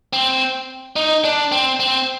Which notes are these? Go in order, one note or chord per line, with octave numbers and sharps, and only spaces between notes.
C4
D#4
D4
C4
C4